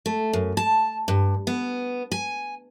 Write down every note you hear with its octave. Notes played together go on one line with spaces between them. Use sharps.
A3
F#2
A5
G2
B3
G#5